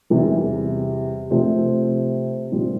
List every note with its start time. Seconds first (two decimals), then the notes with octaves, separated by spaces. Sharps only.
0.10 E2 C3 E3 G3
1.30 C3 F3 A3 C4
2.52 A#2 G3 C4